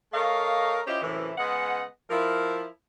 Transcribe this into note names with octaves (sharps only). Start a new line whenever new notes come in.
A3 A#4 C#5 D#5 F5
C#4 E4 F4 G4 C5 D#5
F#2 A2 C3 E3
C#3 G#3 B3 D#5 F#5
F3 E4 A#4